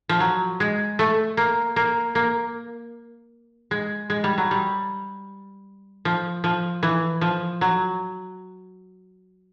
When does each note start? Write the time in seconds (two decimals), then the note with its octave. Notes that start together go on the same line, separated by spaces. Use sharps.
0.09 F3
0.20 F#3
0.60 G#3
0.99 A3
1.37 A#3
1.76 A#3
2.15 A#3
3.71 G#3
4.10 G#3
4.24 G3
4.38 F#3
4.51 G3
6.05 F3
6.44 F3
6.83 E3
7.21 F3
7.61 F#3